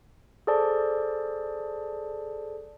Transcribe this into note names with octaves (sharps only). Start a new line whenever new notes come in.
G#4 A4 C5 D5 A5